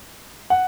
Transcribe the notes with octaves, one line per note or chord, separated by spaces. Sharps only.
F#5